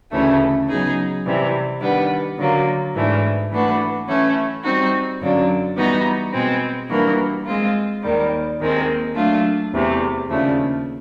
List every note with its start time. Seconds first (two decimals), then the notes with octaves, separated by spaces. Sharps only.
0.12 D2 C#3 E3 A3 C#4
0.69 C#3 F#3 B3 D#4 G#4
1.25 C3 E3 G3
1.81 D#3 G3 B3 D4
2.38 D3 F#3 A#3
2.95 G#2 E3 A3 D4
3.51 E3 A3 D4 F#4 B4
4.08 E3 A3 C#4
4.64 G3 C4 D#4 F#4
5.21 F#2 D3 F#3 A#3 D4
5.77 E3 G3 B3 D#4 F#4
6.33 B2 G#3 C4
6.90 E3 G3 A#3 D4 F#4
7.46 G#3 C4 F4
8.03 D#2 D#3 G3
8.59 D#2 D#3 G#3 C4
9.15 F#3 A3 D4 F4
9.72 E2 C3 E3 A3
10.29 D#2 C#3 F3 A3 D4